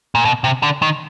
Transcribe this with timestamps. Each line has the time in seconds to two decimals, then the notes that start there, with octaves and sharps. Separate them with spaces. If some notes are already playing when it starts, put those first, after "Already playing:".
0.15 A#2
0.25 B2
0.44 C3
0.63 D3
0.82 D#3